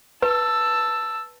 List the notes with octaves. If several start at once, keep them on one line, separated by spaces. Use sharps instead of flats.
B4 A5 E6